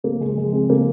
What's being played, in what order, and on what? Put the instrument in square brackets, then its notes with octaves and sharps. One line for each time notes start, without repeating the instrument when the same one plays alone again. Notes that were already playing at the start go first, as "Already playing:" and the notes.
[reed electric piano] C#3 [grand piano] A#3
[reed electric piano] C#3 [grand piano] G#3
[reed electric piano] F3 [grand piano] G#3
[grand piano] G#3 [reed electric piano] C4
[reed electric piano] C#3 [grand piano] A#3